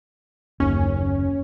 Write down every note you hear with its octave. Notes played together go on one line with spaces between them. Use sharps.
F#1 D#2 C#4